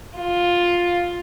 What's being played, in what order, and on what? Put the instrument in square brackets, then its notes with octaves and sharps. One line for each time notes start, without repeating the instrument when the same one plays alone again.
[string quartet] F4